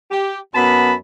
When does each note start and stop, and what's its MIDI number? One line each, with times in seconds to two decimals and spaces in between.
0.11 0.38 67
0.54 0.94 42
0.54 0.94 59
0.54 0.94 81
0.54 0.94 83